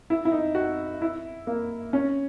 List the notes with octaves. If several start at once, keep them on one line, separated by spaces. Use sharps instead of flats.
E4
E4
D#4
F#4
E4
A#3
C#4